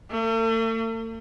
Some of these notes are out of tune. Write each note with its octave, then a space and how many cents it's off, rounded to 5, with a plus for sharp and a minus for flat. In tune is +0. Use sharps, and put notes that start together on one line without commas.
A3 +45